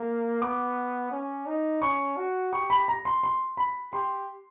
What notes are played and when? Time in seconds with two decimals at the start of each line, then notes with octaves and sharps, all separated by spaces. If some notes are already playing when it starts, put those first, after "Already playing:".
Already playing: A#3
0.42 B3 D6
1.11 C#4
1.46 D#4
1.82 C#4 C#6
2.17 F#4
2.52 G4 C#6
2.70 B5
2.88 A#5
3.05 C6
3.23 C6
3.57 B5
3.93 G4 C6